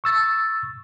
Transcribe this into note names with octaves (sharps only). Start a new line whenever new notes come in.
C#6 E6 A6